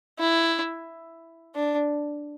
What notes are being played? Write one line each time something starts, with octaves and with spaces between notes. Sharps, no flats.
E4
D4